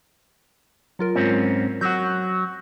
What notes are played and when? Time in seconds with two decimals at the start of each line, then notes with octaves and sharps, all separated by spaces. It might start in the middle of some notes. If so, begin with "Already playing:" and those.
0.99 F#3 F4 A#4
1.15 G#2 C4 C#4
1.81 F#3 F#4 G6 A#6